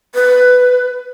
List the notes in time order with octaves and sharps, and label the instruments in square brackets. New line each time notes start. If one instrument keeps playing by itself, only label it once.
[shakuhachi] B4